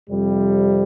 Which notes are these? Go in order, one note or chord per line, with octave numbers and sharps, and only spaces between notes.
F2 C3 G3